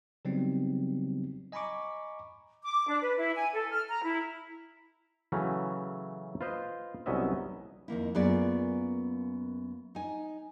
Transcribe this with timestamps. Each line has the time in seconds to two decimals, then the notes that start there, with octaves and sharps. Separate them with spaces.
0.25 C#3 F#3 G3 B3 C4 D#4
1.52 D#5 G#5 A#5 B5 C#6 D6
2.63 D6
2.88 D4
3.02 B4
3.18 E4
3.36 G#5
3.53 A4
3.72 F6
3.89 A#5
4.04 E4
5.32 C#3 E3 F#3 A3 C#4
6.41 F4 B4 C5 D#5
7.06 C2 F#3 B3 C#4 D#5 E5
7.88 F2 D#3 A#3 E4
8.15 F#2 A#3 B3 F4 G#4 D5
9.95 D#4 G#5